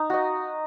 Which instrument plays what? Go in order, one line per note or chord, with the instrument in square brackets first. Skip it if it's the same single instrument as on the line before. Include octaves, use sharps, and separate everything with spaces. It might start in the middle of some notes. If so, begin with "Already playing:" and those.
Already playing: [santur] D#4
F#4 D#5